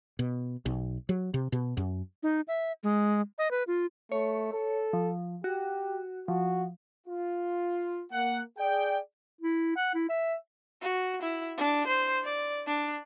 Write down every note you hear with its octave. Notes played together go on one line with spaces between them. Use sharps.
B2
B1
F#3
C3
B2
F#2
D#4
E5
G#3
D#5
B4
F4
A3 C#5
A4
F3
F#4 G4
F3 F#4
F4
A#3 F#5
G#4 D5 G5
E4
F#5
E4
E5
F#4
E4
D4
C5
D5
D4